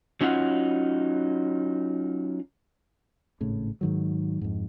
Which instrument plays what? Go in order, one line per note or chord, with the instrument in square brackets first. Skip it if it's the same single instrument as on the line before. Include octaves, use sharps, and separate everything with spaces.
[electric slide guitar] F#3 C#4 D#4 F4 F#5
[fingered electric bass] G#1 A2 C#3
G#2 D#3 F#3
F2 G#2